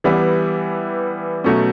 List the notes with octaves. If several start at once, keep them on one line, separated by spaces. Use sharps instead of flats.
E3 G3 B3 E4
B2 F#3 A3 C#4